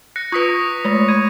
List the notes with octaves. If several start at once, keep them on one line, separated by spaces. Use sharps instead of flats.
F#6 A#6 C#7
F4 B4 C#6 D#6 B6
G#3 A3
G#6 D#7